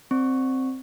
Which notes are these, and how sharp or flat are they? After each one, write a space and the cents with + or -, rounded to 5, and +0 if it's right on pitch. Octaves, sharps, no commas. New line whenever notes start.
C4 +0 D5 +10 C#6 -5